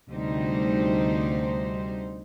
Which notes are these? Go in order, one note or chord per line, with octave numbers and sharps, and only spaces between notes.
D2 C3 G3 D#4 C5